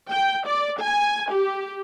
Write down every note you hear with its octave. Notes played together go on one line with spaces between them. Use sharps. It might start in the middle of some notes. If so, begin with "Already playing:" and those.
G5
D5
G#5
G4